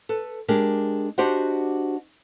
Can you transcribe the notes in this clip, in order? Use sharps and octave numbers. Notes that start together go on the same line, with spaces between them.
A4 B4
G#3 D4 G4 G#4 A#4
D4 F#4 G4 C5 D#5 F#5